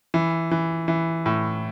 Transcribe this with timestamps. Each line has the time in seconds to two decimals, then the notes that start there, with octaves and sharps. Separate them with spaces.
0.14 E3
0.51 E3
0.88 E3
1.26 A2